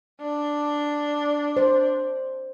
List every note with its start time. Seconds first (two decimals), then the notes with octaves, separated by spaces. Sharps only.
0.21 D4
1.57 C5